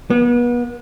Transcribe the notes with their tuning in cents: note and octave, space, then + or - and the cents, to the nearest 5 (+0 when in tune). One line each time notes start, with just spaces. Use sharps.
B3 -35